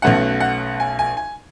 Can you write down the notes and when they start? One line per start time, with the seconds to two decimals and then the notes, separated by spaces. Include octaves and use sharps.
0.02 B1 B2 A3 C#4 F#5
0.40 F#5
0.80 G#5
0.99 G#5
1.17 G#5